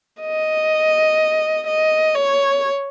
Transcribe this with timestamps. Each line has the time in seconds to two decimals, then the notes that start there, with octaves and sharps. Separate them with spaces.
0.21 D#5
1.67 D#5
2.15 C#5